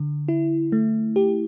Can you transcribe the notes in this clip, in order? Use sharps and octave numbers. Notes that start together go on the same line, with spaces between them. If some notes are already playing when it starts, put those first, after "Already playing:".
Already playing: D3
E4
A3
G4